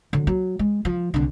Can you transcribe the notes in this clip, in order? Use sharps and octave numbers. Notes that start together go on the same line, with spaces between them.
D3 F#3
F#3
G#3
F3
C2 D3